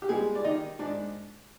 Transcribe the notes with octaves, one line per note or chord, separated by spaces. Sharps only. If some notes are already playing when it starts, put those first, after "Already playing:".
G4
G3 G#3 G#4
D5
D#3 D#4 D#5
G#2 D4 D5